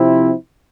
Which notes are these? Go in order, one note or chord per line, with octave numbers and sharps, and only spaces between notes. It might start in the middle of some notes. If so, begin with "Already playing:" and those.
Already playing: C3 F3 C4 E4